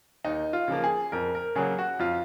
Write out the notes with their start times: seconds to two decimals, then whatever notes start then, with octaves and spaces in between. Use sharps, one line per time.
0.25 D#2 D#4
0.53 F4
0.68 C#3 F3 A#3
0.84 G#4
1.12 F2 A#4
1.35 A#4
1.55 C#3 F#3 A#3 G#4
1.79 F#4
1.99 F2 F4